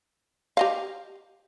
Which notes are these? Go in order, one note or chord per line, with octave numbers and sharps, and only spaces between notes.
G4 D#5 F5